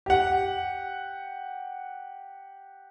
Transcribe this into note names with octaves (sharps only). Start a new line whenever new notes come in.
G4 F#5